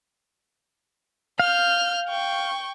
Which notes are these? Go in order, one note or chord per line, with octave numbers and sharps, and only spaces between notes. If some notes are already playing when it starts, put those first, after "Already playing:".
F5 F6 G6
G5 C#6